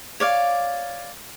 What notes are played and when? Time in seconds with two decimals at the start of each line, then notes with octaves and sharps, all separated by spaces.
0.20 C#5 D5 F5